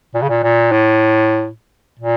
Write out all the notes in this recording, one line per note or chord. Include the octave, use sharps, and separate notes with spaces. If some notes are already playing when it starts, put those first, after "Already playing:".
A#2
C#3
A#2
A#2
A2
A#2